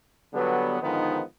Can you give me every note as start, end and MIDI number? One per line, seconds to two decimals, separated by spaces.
0.34 0.78 50
0.34 0.78 54
0.34 0.78 55
0.34 0.78 59
0.81 1.21 44
0.81 1.21 50
0.81 1.21 51
0.81 1.21 53
0.81 1.21 59
0.81 1.21 63